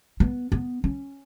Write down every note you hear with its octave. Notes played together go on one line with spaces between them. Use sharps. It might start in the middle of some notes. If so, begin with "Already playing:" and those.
B3
B3
C#4